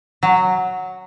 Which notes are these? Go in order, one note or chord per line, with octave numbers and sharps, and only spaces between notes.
F#3